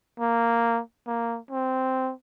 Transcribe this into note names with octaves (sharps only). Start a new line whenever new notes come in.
A#3
A#3
C4